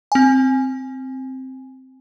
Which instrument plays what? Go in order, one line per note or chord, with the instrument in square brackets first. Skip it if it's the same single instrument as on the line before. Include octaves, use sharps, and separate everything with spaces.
[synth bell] C4 G#5